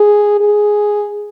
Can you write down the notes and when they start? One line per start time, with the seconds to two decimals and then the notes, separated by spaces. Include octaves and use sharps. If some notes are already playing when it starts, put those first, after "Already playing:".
Already playing: G#4
0.40 G#4